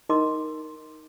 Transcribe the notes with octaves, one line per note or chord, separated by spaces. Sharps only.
D#4 A#4 D#5 C6 D6